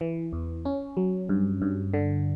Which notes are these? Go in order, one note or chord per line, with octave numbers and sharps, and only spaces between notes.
E3
E2
C#4
F#3
G2
G2
D3